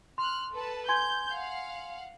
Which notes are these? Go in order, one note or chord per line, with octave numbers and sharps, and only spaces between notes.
C6 F6 F#6
A4 B4 A5
G#5 C6 G6 G#6
F5 F#5